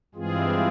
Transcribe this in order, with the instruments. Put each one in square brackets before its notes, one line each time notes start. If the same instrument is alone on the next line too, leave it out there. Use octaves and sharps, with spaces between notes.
[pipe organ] G2 E3 G#3 C4 F4 G#4